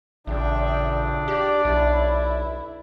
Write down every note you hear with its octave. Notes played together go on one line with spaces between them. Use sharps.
A1 A#2 C#3 D4 E5 G5
F4 G4 D5 D6
B1 E4